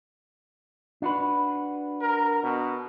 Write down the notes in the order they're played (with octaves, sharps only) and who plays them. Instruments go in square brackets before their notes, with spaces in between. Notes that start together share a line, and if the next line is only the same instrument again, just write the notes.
[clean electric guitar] D4 F#4 B4
[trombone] A#4
B2